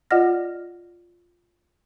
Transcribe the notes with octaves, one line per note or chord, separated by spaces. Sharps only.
F4 D5 D#5 F#5 F6 A#6